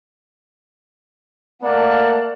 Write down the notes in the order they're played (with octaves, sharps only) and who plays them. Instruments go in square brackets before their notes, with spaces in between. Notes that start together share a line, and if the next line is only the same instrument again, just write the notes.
[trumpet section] A3 A#3 [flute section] D5 F#5 A5